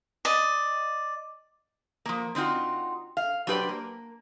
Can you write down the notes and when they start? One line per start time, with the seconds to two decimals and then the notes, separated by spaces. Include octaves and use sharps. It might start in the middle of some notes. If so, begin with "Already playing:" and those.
0.25 D5 D#5
2.06 F3 A#3
2.35 D3 C4 D#4 F4 F#4
3.17 F5
3.47 F#3 D4 G4 B4 C5 D5
3.69 A#3